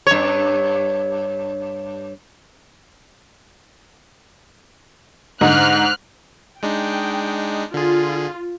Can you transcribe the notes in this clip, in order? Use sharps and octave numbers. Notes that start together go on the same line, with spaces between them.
G2 C#5
G#2 D3 D#4 F6 F#6
G#3 D4 D#4 G5
D3 F4 G#4